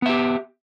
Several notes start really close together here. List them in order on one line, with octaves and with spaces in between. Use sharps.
B3 E5 G4